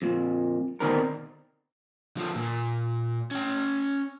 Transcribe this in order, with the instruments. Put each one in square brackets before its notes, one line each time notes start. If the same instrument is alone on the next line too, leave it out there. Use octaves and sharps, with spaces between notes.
[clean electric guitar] F2 A#2
B2 D3 D#3 C4 D4 A#4
[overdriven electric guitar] D3 F3
A#2
C#4 G5